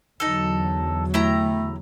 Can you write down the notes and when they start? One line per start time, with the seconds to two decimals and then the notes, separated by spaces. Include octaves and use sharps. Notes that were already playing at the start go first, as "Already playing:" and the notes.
0.20 E2 D3 F#3 D#4 A4
1.14 A3 E4 G4 A#5